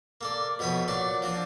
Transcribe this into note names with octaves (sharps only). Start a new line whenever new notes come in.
A#3 A4 D5
F2 B2 F3 C#5 B5 D#6
A#2 F#3 D5 C#6
F3 C4 D4